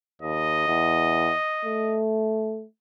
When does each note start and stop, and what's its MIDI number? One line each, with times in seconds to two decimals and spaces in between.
0.22 0.64 39
0.22 2.00 75
0.68 1.32 40
1.65 2.64 57